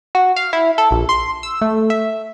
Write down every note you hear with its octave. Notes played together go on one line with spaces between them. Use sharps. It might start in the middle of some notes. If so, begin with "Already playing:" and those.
F#4
F5
E4
A4
A#1
C6
E6
A3
E5